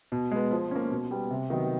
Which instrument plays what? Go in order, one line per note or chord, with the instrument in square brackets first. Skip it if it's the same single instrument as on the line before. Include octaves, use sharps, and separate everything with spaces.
[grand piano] B2
G#3 B3
F3
A#3 C#4
B2
G3 B3
C3
D#3 F#3 B3 D#4